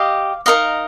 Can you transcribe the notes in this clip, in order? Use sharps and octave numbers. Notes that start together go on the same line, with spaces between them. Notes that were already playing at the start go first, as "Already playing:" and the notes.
Already playing: G4 D#5 F5
D#4 A#4 D#5 F5